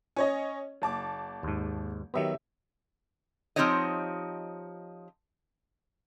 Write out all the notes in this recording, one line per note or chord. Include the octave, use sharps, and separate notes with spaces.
C#4 C#5 D#5
F#1 A5 D6
D#2 G#2
D#3 F#3 B3 G4 E5
F3 C4 D#4 G4 C#5 D#5